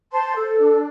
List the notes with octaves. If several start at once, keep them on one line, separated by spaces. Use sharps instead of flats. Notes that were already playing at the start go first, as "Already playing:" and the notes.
C5 A5 C6
A4
D4